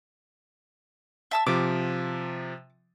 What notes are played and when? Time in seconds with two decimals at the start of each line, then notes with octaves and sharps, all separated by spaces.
1.31 E5 A5 E6
1.46 C3 F3 D6